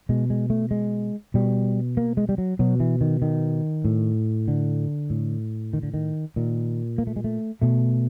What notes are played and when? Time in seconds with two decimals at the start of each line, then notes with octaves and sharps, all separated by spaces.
0.09 B2 G#3
0.30 G#3
0.50 A3
0.71 G#3
1.34 B2 G3
1.97 A#3
2.17 G#3
2.29 G3
2.38 F#3
2.59 B2 F#3
2.80 E3
3.01 D#3
3.22 D#3
3.85 A2
4.48 D3
5.10 A2
5.73 D#3
5.83 D3
5.94 D#3
6.36 A#2 D#3
6.98 A#3
7.07 A3
7.16 G#3
7.24 A3
7.62 B2 A3